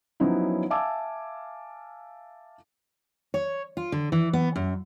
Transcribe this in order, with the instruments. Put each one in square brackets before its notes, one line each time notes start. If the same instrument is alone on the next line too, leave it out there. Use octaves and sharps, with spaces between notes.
[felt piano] F3 F#3 B3 C#4 D#4 E4
E5 F5 G#5 A5 D6 E6
[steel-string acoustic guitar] C#5
F4
D3
E3
B3
F#2